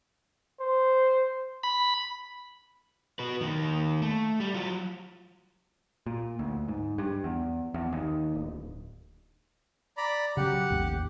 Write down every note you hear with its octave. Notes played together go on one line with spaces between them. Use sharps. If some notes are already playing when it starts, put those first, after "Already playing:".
C5
B5
F#4 B4
D#3 A#3
A3
G3
F#3 F4
A#2
D2
G#2
G2
E2
E2
D#2
D1
D5 A#5 B5
C#3 F#3 G4 F#5
A1 D#2